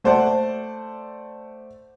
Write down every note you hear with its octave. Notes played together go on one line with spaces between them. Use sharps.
A3 C5 D5 F#5 A5